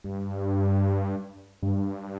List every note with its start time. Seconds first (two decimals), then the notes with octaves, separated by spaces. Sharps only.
0.04 G2
1.62 G2